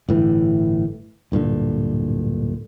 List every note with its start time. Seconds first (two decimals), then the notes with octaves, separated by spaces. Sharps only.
0.08 G1 A2 E3
1.32 D1 G2 A#2 D3